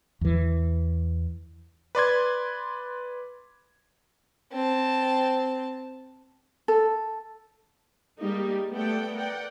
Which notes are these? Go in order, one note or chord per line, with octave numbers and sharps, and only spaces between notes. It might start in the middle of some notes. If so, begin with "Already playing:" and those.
E2 E3
B4 D5 C6 G#6
C4 A5
A4
G3 G#3 A#3 D#4 G4
A3 B3 A4 D5 F#5 G5
A#4 D5 F#5 G5